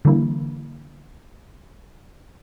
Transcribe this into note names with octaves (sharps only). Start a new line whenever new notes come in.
D3 E3 G3 A#3 E4